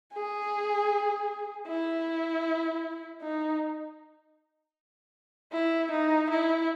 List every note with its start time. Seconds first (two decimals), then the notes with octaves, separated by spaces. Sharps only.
0.13 G#4
1.67 E4
3.22 D#4
5.52 E4
5.91 D#4
6.30 E4